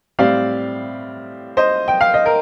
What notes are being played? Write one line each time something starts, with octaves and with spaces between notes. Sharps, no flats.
A2 G3 C4 D5 F5
C5 D#5
G5
F5
D#5
A#4